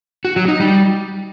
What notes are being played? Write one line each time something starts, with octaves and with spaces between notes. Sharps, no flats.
F#4
F#3
D#4
G3